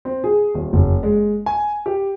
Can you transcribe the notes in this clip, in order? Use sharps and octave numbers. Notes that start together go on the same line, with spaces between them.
C4
G#4
D#1
F#1
G#3
G#5
G4